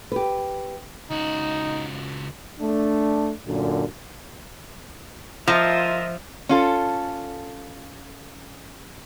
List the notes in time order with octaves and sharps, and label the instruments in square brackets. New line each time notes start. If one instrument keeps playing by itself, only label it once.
[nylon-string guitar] G4 B4
[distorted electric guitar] C#2 F#4 [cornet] D#4
[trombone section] A3 D4
F#2 A#2 D3
[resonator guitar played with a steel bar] F3 [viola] F4 E5 [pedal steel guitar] A#4 C5 D#5
[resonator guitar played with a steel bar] C#4 F4 A4